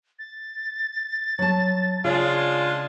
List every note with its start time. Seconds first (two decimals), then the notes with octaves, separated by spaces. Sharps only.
0.19 A6
1.39 F#3 A5
2.04 C#3 G#3 D4 F4